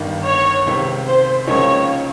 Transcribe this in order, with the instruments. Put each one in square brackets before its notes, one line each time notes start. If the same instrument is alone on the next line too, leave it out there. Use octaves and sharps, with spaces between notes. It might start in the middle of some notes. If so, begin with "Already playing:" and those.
Already playing: [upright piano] G1 G2 D#3
[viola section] C#5
[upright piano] C#2 C3 D#3
[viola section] C5
[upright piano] C#2 C#3 F3 A#3 D#4 [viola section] C#5